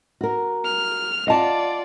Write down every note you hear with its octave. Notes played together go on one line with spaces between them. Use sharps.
F#4 A#4
F6
F4 D5 D#5 F#5 A5